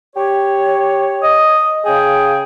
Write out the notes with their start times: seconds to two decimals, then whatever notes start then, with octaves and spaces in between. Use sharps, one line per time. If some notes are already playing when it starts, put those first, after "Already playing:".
0.16 G4 C#5
1.23 D#5
1.85 C#3 G#4 F5 G5